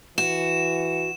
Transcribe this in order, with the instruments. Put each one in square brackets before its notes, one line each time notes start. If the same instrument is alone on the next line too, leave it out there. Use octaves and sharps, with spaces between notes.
[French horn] E3 [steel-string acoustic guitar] F#4 [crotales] E7